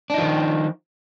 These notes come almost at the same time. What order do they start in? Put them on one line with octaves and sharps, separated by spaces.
D4 D#4 F3 D#3